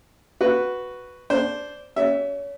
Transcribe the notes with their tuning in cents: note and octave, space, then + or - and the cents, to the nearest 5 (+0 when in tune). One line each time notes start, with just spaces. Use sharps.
F#4 +0 B4 +0
D4 -15 C5 +0
C#4 +30 F#4 +45 E5 +0